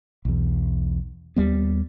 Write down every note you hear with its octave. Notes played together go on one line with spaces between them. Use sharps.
B1 E2
D#2 G3 B3